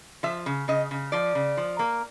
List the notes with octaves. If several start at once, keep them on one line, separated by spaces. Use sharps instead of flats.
F3 E5
C#3
C#3 D#5
C#3
F3 D5
C#3
F3
A#3